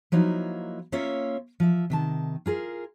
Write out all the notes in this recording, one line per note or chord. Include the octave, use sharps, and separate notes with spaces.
F3 F#3 A#3 D#4 E4
A#3 C#4 F4 C#5 E5
F3 E5
C3 D#3 A5
F4 G#4 A#4